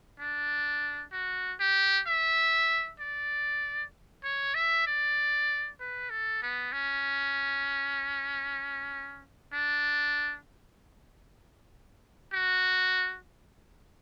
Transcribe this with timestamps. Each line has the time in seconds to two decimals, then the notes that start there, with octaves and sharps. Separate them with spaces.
0.20 D4
1.13 F#4
1.60 G4
2.07 E5
3.00 D5
4.24 C#5
4.55 E5
4.87 D5
5.80 B4
6.10 A4
6.42 B3
6.72 C#4
9.53 D4
12.33 F#4